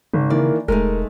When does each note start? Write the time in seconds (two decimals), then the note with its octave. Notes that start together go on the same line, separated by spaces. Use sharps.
0.13 G#1 C#3
0.30 D#3 E3 A#3 D5
0.68 E1 G#3 A3 D#4 A#4